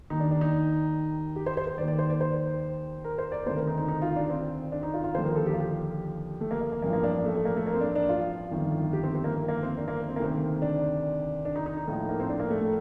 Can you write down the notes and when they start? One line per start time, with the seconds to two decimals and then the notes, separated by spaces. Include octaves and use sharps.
0.10 D#2 D#3 D#4
0.20 D4
0.31 D4
0.41 D#4
1.36 G4
1.46 C5
1.57 C5
1.67 C5
1.78 D#3 D5
1.82 D#2
1.88 D5
1.99 C5
2.10 D5
2.21 C5
3.04 A#4
3.18 C5
3.32 D5
3.46 D2 C3 D#3 C5
3.56 A#4
3.67 D#4
3.78 D#4
3.88 D#4
4.02 F4
4.16 D4
4.30 C4
4.72 D4
4.83 D#4
4.94 F4
5.04 F4
5.14 D#2 D3 F3 C5
5.24 A#4
5.36 A4
5.46 G4
5.53 F4
5.60 G4
6.41 A3
6.51 A#3
6.61 A#3
6.72 A#3
6.82 A1 G2 F3 A#3
6.93 A#3
7.04 D4
7.14 D4
7.25 A3
7.35 A3
7.45 A#3
7.56 A3
7.67 A#3
7.74 C4
7.81 D4
7.95 D4
8.09 F4
8.51 G1 F2 D#3
8.93 G4
9.03 C4
9.15 C4
9.24 A#3
9.35 A#3
9.48 A#3
9.63 C4
9.77 D4
9.88 A#3
10.09 C4
10.16 A#3
10.19 D2 C3 D#3 C4
10.62 D4
11.45 D4
11.56 D#4
11.66 D#4
11.77 D#4
11.87 A#1 A2 F3
12.09 A#3
12.20 C4
12.29 D4
12.40 A#3
12.50 A3
12.61 A3